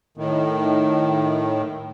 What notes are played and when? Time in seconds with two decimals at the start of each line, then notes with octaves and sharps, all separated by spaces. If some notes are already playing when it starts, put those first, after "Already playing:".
0.18 A2 D#3